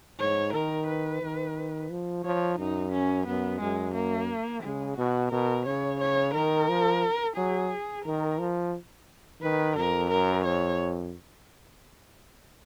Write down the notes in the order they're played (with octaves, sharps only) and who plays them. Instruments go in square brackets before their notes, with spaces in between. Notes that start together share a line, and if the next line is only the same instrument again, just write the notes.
[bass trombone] G#2 [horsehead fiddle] C#5
[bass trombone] D#3 [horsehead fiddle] A#4
[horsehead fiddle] B4
[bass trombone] D#3
F3
[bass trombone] F3 [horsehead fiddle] C#5
[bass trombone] F#2 [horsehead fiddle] D#4
[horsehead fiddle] C#4
[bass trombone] F#2 [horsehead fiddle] B3
[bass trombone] F#2 [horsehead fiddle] G#3
[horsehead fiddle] A#3
[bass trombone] C#3 [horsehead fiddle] G#3
[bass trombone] B2 [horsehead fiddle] F#4
[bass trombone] B2 [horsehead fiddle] A#4
[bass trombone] C#3 [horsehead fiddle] C#5
[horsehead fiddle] C#5
[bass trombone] D#3 [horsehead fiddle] A#4
[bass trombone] F3
[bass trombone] F#3 [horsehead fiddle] G#4
[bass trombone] D#3 [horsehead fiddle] A#4
[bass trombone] F3
[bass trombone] D#3 [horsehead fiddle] B4
[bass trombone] F2 [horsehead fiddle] A#4
[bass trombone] F#2 [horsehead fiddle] A#4
[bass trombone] F2 [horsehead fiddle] C#5